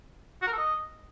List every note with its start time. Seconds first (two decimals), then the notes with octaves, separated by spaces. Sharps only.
0.42 F#4
0.47 A#4
0.53 A4
0.58 D#5